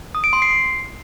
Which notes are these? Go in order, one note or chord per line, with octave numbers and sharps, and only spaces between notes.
D#6
D7
C6
C7